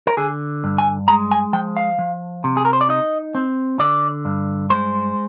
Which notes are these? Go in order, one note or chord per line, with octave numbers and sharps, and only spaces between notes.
A#4
D3 G#4
G2
G#5
G#3 A#5
G#5
F3 G5
F5
F3
C3
G#4
A#4
C5
D5
D#4 D#5
C4
D3 D5
G2
G#3 C5